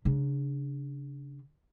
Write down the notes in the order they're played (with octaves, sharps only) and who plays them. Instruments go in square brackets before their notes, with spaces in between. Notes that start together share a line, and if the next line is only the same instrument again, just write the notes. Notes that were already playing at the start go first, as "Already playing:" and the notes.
[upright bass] C#3 D4